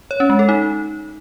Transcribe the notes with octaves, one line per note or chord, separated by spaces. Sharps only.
C#5
C#4
G#3
A4
D#4